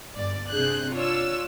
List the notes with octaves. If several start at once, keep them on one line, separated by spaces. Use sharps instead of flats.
G1 D5
C3 D4 G#4 F#6 G6
D4 F4 C#5 E6